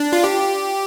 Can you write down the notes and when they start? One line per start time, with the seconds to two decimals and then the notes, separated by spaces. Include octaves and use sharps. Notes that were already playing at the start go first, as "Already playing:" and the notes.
Already playing: D4
0.13 F4
0.24 G4